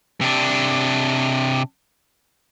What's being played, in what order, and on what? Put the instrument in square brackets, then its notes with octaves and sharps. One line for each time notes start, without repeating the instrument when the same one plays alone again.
[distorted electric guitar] C3 D4